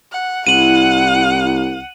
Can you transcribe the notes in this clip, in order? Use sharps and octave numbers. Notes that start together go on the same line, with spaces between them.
F#5
C2 E4 F#5 D#7 F#7